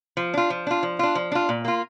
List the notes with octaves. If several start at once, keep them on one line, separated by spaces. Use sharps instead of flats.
F3
D4 F4
F3
D4 F4
F3
D4 F4
F3
D4 F4
A#2
A#3 F4